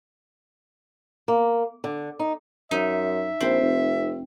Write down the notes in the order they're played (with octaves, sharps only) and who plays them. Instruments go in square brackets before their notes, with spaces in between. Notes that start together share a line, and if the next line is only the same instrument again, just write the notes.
[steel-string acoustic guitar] A#3
D3
D#4
[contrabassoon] F#2 [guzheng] D#4 [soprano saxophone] E5
[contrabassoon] A#1 [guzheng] C4
[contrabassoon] F1